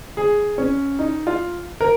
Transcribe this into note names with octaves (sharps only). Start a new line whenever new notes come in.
G#4
C#4
D#4
F4
A#4